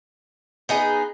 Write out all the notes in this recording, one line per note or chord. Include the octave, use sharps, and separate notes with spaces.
B3 D#4 G#4